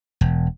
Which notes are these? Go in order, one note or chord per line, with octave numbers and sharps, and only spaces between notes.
E1